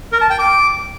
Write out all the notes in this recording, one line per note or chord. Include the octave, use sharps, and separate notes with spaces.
A#4
A5
G5
D6